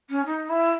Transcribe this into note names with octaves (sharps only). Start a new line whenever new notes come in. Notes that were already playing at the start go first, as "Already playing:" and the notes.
C#4
D#4
E4